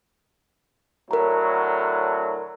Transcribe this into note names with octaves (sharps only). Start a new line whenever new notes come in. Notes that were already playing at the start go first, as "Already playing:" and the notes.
A2 D3 F#3 A#4 A#5